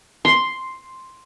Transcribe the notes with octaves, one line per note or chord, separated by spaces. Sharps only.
C6